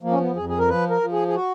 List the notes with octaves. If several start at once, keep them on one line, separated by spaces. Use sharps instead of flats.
F3 A#3
C#4
B3
F2 G#4
G#4
A#4
F3 B4
A#4
F3
G#4
G#4
F#4